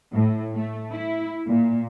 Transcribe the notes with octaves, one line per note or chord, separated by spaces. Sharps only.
A2
A3
E4
A#2